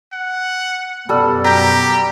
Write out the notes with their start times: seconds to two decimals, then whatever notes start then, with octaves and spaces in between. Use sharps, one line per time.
0.13 F#5
1.09 F#2 B2 G3 A4
1.45 G4 G5 A#5